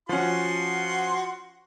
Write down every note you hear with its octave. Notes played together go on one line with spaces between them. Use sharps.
F3 C#4 F#4 F#5 C6